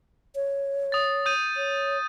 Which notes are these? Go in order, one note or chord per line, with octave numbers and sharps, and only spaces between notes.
C#5
D#6 A6
D#6 G6 D#7
C#5